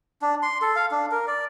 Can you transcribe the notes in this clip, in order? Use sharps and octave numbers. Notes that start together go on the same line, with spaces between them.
D4
C6
A4
F5
D4
A#4
D5